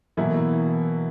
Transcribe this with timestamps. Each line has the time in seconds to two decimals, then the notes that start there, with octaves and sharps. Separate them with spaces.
0.17 B2 E3 F#3 A#3 E4